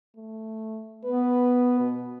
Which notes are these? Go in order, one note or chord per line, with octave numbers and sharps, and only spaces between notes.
A3
B3 B4
B2